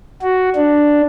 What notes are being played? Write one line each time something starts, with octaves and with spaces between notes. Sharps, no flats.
F#4
D4